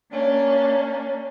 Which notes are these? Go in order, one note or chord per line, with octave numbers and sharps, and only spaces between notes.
A#3 C#4 D4